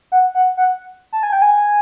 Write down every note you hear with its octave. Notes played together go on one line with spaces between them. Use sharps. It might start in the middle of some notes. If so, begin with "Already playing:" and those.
F#5
F#5
F#5
A5
G#5
G5
G#5